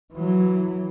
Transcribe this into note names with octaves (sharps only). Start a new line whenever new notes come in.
E3 F#3